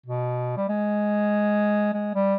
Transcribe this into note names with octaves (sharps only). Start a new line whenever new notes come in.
B2
G3
G#3
G#3
G3